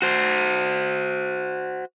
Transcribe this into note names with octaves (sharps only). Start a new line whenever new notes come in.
F#4 C5